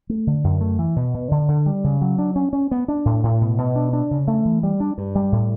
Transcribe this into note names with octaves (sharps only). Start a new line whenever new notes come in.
A3
D3
F#2
A3
E3
B2
B2
D3
D3
G3
C#3
F#3
D4
C#4
C#4
B3
D4
A2
A2
B2
B2
D4
D4
C#3
A3
E3
G3
D4
G2
G3
A2